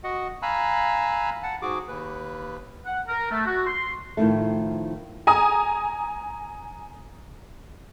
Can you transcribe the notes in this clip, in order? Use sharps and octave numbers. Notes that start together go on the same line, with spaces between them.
F#4 D#5 F#5
F5 G#5 A#5 B5 E6 F#6
F#5 A5
G#2 F#4 G#4 D6
D#2 B4
F#5
A#4
A3
F#4
C6
A2 D#3 F3 A3
G#5 A#5 D#6